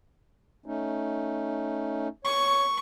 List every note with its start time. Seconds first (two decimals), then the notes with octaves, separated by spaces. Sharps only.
0.66 A3 C#4 D#4
2.25 C#5 C#6